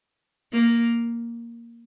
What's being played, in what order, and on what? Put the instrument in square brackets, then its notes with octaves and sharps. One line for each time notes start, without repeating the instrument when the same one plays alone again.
[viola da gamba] A#3